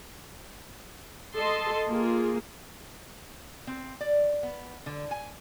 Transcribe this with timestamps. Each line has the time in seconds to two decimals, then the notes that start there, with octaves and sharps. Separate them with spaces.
1.36 A4 D#5 A5 C6
1.87 A#3 F4 G#4
3.67 C4
4.01 D5
4.43 B3
4.86 D3
5.11 G#5